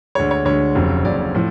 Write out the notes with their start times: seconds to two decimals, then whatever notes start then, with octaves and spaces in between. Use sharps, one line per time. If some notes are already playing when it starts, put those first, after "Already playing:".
0.15 D2 D3 G#3 C#5
0.31 C#5
0.45 D2 D3 G#3 C#5
0.75 F1 F2 C#3 F#3
1.05 F1 F2 C#3 F#3 D5
1.35 A2 F3